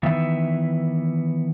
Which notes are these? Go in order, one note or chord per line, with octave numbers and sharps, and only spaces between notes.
D#3 E3 B3 E5